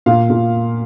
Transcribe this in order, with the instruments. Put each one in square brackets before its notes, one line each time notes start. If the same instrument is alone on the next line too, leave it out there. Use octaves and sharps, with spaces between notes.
[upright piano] A#2 F5
A#2